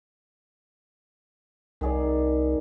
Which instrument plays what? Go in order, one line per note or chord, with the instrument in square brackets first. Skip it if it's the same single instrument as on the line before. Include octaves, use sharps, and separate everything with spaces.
[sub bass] C2 [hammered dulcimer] D#3 G#4 D5